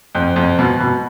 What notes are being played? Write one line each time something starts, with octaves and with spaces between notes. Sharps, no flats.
F2
F2
B2
B2